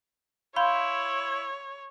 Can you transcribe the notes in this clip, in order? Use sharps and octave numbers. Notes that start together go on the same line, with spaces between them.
E4 C#5 F5 B5 C6 G6